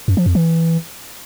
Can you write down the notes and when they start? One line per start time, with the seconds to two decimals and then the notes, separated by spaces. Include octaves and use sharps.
0.08 F#2
0.17 F3
0.26 F2
0.35 E3